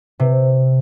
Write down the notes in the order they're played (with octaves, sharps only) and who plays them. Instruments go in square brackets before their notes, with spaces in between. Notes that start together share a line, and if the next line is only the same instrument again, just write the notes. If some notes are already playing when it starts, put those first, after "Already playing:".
[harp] C3